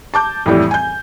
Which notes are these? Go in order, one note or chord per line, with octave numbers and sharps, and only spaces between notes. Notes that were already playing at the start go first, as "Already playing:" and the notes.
A5 D6 G6
F2 A2 E3 G3
G#5 G6